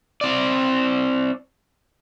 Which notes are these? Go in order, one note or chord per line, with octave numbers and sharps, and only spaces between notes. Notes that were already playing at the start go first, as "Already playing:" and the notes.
C4 D5